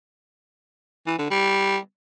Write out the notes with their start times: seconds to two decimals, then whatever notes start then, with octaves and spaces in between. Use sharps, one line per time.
1.07 E3
1.19 D3
1.30 G3